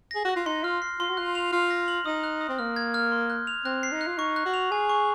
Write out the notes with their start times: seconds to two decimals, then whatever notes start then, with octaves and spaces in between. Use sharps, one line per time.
0.11 G#4 A#6
0.25 F#4 F#6
0.36 F4
0.46 D#4 C6
0.64 F4 F6
0.82 C7
0.99 F4 C6
1.10 F#4
1.17 F4 F#6
1.35 F7
1.53 F4 F6
1.71 A#6
1.88 F#7
2.06 D#4 D#6
2.24 F#6
2.41 D#6
2.49 C4
2.59 A#3 F6
2.76 G#6
2.94 F6
3.12 C6
3.30 F#6
3.47 F7
3.65 C4 F#6
3.83 C7
3.92 D#4
4.01 F#6
4.07 F4
4.18 D#4 C#6
4.36 F#6
4.46 F#4
4.54 F7
4.71 G#4 G#5
4.89 C#6